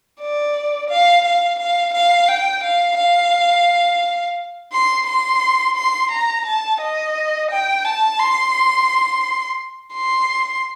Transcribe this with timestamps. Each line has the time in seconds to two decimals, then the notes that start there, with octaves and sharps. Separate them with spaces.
0.21 D5
0.90 F5
1.25 F5
1.59 F5
1.94 F5
2.28 G5
2.64 F5
2.99 F5
4.72 C6
5.07 C6
5.76 C6
6.11 A#5
6.46 A5
6.81 D#5
7.51 G5
7.85 A5
8.19 C6
9.94 C6